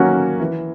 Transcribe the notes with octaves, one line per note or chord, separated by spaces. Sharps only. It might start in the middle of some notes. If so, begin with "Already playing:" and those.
Already playing: D#3 F#3 A#3 C#4 F#4
E3